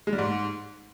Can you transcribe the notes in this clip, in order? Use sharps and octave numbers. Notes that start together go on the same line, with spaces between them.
G#3
G3
G#2